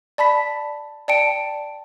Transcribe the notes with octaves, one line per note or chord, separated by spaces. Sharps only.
D5 A5 B5 B6
D5 G5 A5 C#7 D7